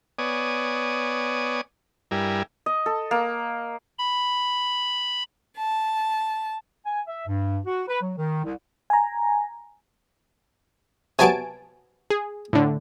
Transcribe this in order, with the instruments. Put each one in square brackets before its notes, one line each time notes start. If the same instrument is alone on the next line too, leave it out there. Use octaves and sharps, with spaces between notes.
[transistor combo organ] B3 C#5 D5 G#5 D#6
G2 G3 E4 A#4 G#5
[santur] D#5
A4
A#3
[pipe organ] B5
[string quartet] A5
[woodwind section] G#5
E5
G2
F#4
B4
F#3
D#3
C2
[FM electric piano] G#5 A#5
[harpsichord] C3 F#3 B3 [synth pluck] G#5 A5 D7
[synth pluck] G#4
A2 D3